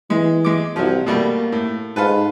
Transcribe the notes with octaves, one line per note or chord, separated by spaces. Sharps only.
E3 G#3
G#3 D6
C2 F3 F#3
B2 G3 A3 A#3
A2
G#2 F4 A4 B4